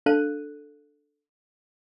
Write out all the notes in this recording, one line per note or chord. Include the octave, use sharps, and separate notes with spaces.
D4 A4 F5 F#6 D#7